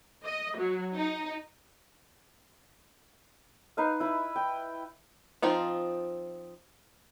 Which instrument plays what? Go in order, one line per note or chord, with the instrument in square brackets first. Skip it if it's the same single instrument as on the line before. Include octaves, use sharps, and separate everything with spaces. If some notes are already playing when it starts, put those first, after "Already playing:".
[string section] D#5
F#3
D#4
[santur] D#4 B4 F5
E4 B5
G5
[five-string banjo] F3 C4 D#4 F4